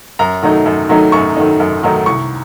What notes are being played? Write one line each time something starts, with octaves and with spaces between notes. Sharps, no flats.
F#2 A#5
D#3 F#3 A3 D#4
F#2
D#3 F#3 A3 D#4
F#2 C#6
D#3 F#3 A3 D#4
F#2
D#3 F#3 A3 D#4
C2 C#6